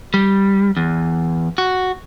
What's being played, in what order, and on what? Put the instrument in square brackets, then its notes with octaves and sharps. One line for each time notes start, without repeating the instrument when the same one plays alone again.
[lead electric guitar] G3
E2
F#4